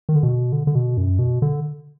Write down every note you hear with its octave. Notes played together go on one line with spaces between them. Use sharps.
D#3
D3
B2
D3
D3
B2
F#2
B2
D3